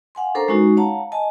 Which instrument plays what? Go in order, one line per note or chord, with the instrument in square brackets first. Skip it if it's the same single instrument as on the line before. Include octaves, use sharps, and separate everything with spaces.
[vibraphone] F5 F#5 G#5 C6
C#4 D4 A4 A#4 C5 A#5
G#3 C#4 D#4 F#4
C#5 F5 F#5 A5 A#5
D#5 G#5 A5